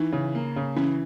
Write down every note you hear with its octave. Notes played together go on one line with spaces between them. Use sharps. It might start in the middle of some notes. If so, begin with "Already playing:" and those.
Already playing: E3 D#4
C#3
A#3
C#3
E3 C#4